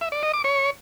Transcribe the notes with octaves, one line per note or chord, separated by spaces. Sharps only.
E5
D5
D#5
D6
C#5